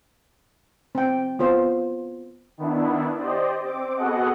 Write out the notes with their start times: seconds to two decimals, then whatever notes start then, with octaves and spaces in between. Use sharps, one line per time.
0.95 C4 G5
1.39 B3 F4 C5
2.58 D#3 B3 D4 E4
3.19 G4 C5 D5 D#5
3.63 C4 D6
3.97 B3 F#4 G#4 A4 D#5 F#5